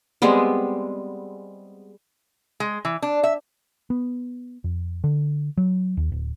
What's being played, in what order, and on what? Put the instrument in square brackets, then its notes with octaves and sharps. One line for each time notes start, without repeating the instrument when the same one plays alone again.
[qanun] G3 G#3 B3 C4
[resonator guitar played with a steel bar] G#3
E3
D4
E5
[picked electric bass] B3
F2
D3
F#3
D#2
D1